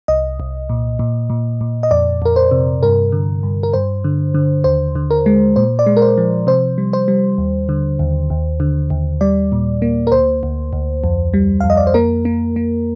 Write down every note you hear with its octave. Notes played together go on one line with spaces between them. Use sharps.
C2 D#5
C2
A#2
A#2
A#2
A#2
D#5
F2 D5
F2 A#4
C5
C3
G2 A#4
D3
G2
A#4
G2 C5
D3
D3
D#2 C5
D3
A#4
G#3
A#2 C5
D5
G#3
A#4
C5
F3
C3 C5
G3
C5
G3
D#2
D3
D#2
D#2
D3
D#2
G3 D5
A#2
A#3
A#4
D2 C5
D2
D2
F2
G3
F2 F5
D#5
D5
C5
A#3 A#4
A#3
A#3